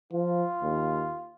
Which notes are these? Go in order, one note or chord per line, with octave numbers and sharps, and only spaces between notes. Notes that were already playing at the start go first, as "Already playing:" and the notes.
F3 F4
D#2